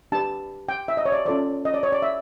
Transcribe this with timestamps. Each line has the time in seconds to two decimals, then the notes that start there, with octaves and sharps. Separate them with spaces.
0.12 D4 G4 B4 A5
0.69 G5
0.88 E5
0.97 D#5
1.06 C#5
1.12 D5
1.25 C#4 F4 A4 C5 D5
1.65 D#5
1.74 D5
1.83 C#5
1.92 D5
2.02 E5